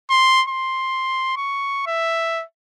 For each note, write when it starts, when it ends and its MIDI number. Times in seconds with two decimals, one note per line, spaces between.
0.10 0.43 84
0.48 1.34 84
1.36 1.85 85
1.87 2.44 76